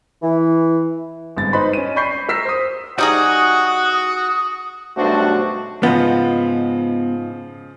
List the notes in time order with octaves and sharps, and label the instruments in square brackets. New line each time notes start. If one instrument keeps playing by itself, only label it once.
[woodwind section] E3
[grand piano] G1 G#2 C4 A6
D#4 B4 C5 B5 C6
C#4 D#5 D#7
D5 B5 C#6 G6 B6 C7
A#4 E6 B6 C7
C5 D#6
[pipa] G3 D#4 G#4 [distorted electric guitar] F#4 [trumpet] F#5 [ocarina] D#6
[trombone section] B1 G2 A3 D4 F#4 C5
[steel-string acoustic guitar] G#2 F4 F#5 [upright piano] C#3 F3 [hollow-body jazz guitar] B3 D#5